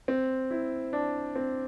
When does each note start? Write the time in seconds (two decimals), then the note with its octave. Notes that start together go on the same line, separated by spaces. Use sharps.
0.08 C4
0.51 E4
0.93 D4
1.36 C4